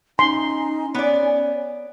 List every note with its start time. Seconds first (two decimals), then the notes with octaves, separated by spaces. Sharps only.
0.19 C#4 D#4 C6
0.94 B3 C#5 D5